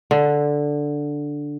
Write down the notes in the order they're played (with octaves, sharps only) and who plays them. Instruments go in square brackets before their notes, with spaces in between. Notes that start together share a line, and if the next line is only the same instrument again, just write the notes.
[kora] D3